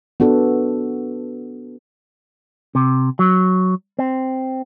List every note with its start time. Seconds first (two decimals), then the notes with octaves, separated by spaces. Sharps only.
0.20 B3 D4 F#4 A4
2.75 C3
3.19 F#3
3.99 C4